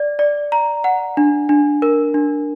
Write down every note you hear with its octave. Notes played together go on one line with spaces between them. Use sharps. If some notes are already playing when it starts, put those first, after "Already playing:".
Already playing: D5
D5
A#5
F#5
D4
D4
A#4
D4